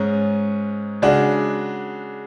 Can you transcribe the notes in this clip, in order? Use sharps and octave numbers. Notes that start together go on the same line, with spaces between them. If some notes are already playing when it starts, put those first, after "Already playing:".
Already playing: G#2 G#3 C#4
C#3 G#3 D4 F#4